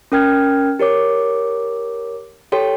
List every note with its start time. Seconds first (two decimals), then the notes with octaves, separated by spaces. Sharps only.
0.12 C#4 A#4 G5 F6 G#6
0.79 G4 A#4 C#5 D6
2.52 G4 A4 C#5 G5 C6